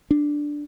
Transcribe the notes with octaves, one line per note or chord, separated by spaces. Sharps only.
D4